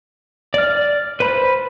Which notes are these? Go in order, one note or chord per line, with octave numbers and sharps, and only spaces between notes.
D5 F6
B4 C5 B5